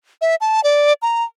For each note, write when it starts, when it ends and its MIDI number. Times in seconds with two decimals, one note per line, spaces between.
0.21 0.35 76
0.41 0.63 81
0.64 0.93 74
1.02 1.23 82